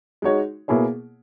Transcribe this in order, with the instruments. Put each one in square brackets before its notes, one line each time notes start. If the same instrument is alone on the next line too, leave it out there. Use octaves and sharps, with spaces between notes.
[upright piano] G#3 D#4 F#4 C#5
B2 A#3 E4 G#4 C#5